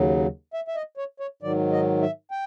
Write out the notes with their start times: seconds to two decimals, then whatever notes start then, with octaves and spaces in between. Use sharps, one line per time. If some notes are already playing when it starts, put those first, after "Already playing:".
Already playing: D#2 C#3 F#3
0.54 E5
0.68 E5
0.76 D#5
0.97 C#5
1.20 C#5
1.42 G#2 D#3 F#3 D5
1.72 D#5
2.02 E5
2.31 G5